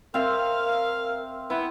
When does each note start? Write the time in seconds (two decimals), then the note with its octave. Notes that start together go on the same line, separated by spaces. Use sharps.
0.14 C4 A#4 E5 F5
1.50 B3 E4